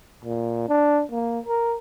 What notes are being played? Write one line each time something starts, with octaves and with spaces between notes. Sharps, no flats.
A#2
D4
A#3
A#4